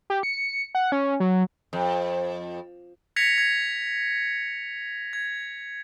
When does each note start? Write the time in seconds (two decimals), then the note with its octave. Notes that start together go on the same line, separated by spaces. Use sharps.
0.10 G4
0.23 C#7
0.75 F#5
0.92 C#4
1.20 F#3
1.73 F2
3.16 G#6 A#6 B6 C#7 F7
3.38 G#6
5.13 G#6